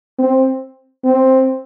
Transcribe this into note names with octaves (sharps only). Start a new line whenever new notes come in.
C4
C4